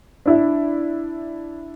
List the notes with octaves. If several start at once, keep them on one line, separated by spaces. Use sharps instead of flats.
D4 E4